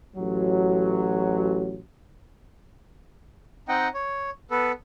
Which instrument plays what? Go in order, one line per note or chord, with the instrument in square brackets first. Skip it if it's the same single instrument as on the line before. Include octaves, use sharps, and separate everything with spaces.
[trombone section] A1 F#3
[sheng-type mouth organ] C4 D#4 D#5 F#5 G5
C#5
B3 A4 B4